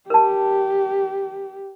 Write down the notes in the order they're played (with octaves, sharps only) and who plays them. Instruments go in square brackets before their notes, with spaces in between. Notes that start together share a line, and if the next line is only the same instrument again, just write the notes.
[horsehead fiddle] G4 [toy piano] A#4 A5